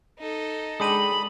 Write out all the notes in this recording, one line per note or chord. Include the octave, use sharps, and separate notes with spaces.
D#4 A4
G#3 D4 G5 B5 D#6 D#7 F#7